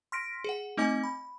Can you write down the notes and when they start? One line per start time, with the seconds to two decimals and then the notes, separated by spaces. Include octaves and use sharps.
0.12 C6 F6 A#6 B6 D7
0.44 G#4 F#5
0.77 A3 C4 D#4 D#5 G#5 D6
1.04 B5